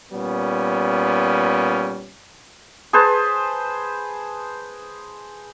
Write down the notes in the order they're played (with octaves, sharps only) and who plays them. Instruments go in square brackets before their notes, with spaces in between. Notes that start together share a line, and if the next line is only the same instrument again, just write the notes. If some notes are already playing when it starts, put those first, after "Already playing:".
[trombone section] A#2 G3 B3 C#4
[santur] G#4 B4 C5 A5